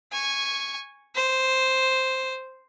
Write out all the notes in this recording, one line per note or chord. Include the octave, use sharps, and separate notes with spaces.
G#5 C#6
C5